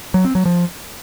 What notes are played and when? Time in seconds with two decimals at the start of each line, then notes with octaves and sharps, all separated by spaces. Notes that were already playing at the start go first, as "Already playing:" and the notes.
0.14 F#3
0.25 C4
0.35 F#3
0.45 F3